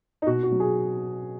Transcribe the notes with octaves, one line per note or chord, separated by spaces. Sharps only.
D#4
B2 F#4
F#4
F#3
G#4